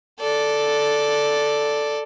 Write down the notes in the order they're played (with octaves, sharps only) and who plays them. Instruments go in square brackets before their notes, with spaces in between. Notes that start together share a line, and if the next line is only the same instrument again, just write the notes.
[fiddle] A4 D5